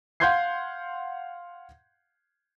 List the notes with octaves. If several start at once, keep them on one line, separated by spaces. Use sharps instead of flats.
F5 F#5 C6 G6 G#6 C7